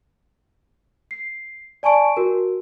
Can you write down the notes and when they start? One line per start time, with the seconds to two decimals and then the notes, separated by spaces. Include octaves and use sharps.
1.11 C7
1.83 D5 G#5 A5 C#6 D7
2.17 F#4 A#4